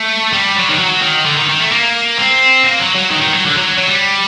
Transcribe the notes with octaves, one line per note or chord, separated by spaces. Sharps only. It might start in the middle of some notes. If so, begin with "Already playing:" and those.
Already playing: A3
G3
F#3
D#3
F#3
D#3
D3
D#3
D#3
A3
A#3
C4
A#3
F#3
F#3
D#3
D#3
F#3
D3
F#3
F#3
G3